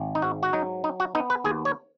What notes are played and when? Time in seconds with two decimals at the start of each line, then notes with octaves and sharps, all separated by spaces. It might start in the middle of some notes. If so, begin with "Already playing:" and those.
Already playing: G#1
0.15 D#4
0.22 G#2 F#4
0.43 F#4
0.53 F#3 D#4
0.84 D#4
1.00 F#4
1.15 B3 D#4
1.30 B4
1.44 D#2 G#4
1.65 C#5